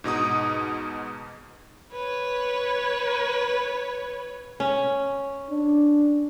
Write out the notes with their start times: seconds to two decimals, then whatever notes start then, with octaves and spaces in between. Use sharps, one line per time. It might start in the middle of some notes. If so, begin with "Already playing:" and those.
0.04 G#2 B2 D#4 D#6
1.92 B4 C#5
4.60 C#4
5.50 D4